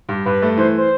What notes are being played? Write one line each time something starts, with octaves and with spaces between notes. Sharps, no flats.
G2
G2 B4
A3
E3 C5
C5